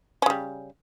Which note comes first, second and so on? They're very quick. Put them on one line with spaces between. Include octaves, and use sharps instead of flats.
C#4 C#3 G3